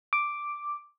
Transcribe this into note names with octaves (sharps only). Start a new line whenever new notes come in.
D6